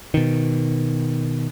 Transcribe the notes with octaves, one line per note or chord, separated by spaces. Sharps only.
B2 D#3